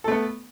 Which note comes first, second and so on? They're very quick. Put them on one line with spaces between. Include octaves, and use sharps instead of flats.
A4 A3 B3